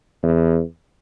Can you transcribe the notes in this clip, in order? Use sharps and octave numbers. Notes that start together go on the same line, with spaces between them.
E2